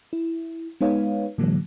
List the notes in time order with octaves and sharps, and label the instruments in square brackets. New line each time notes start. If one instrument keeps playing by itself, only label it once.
[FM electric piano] E4
G#3 B3 D#4 B4 C#5 F5
A2 D3 E3 F#3 G#3 A#3